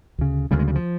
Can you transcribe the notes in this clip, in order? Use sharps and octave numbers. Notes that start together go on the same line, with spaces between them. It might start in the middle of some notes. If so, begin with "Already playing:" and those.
D2 C#3
D2 C#3 G3
G#3
G3
F3